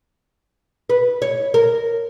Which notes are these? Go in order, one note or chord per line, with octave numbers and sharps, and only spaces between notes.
B4
C#5
A#4